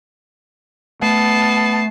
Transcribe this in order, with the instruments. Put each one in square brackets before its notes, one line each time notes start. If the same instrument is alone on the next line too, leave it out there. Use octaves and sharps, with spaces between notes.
[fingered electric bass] A3 [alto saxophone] B3 [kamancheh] A5 [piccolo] C7